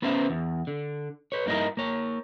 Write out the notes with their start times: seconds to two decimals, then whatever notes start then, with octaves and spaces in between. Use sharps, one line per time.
0.02 B3 C#4 B4 C5 E5
0.30 E2
0.67 D3
1.32 B4 C#5
1.46 G2 A#3 D#4 E4 A#4 D#5
1.77 A#3 C#5